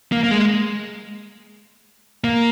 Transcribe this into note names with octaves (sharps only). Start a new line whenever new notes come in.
A#3
A#3
G#3
A#3